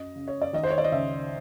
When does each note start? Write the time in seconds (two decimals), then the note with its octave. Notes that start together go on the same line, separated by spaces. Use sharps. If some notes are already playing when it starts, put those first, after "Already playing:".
Already playing: F#2 D#5
0.16 C#3
0.28 C#5
0.42 D5
0.53 D#3 D#5
0.63 C5
0.70 C#5
0.78 D5
0.84 D#5
0.92 C#2 E5